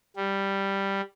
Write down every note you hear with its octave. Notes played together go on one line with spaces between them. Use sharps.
G3